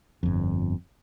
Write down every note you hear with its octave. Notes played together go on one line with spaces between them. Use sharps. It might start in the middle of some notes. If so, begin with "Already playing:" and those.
G1 F2